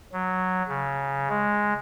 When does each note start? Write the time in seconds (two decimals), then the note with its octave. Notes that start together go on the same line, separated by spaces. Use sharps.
0.13 F#3
0.68 C#3
1.29 G#3